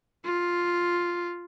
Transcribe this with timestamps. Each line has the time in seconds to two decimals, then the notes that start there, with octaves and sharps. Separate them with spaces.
0.25 F4